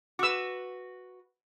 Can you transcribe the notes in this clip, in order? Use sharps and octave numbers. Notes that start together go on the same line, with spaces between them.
F#4 B4 D6 E6